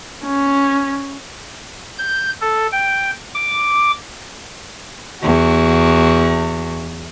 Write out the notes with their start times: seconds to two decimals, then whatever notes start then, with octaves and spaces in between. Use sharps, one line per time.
0.24 C#4
1.98 G6
2.41 A4
2.72 G5
3.35 D6
5.22 E2 F#4